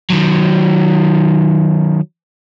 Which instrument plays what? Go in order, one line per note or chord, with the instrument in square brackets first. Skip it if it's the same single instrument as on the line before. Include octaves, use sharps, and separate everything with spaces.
[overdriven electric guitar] D#3 F#3